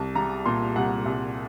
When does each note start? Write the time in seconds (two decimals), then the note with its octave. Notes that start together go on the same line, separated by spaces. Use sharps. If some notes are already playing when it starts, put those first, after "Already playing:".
Already playing: C2 A5
0.15 G3 A#5
0.46 A#2 C6
0.76 C2 F#5
1.06 C2